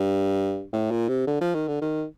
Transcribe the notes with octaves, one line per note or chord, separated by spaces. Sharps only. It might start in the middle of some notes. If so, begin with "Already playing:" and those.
Already playing: G2
A2
A#2
C3
D3
F3
D#3
D3
D#3